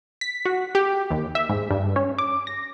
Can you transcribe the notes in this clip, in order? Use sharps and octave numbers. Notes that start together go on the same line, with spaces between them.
B6
F#4
G4
D#2
E5
G#2
G2
C#4
D6
A#6